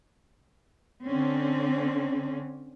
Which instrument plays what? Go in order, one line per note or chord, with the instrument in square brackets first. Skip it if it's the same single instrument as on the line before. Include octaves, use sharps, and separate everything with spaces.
[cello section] D3 C4 C#4